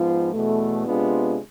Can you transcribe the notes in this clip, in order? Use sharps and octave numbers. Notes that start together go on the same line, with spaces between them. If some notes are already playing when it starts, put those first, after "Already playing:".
Already playing: G#2 F3 B3 F4
E2 B2 A3
C3 G#3 B3 D4 F4